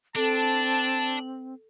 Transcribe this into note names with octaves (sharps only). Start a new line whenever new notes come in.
C4 D4 A4 A5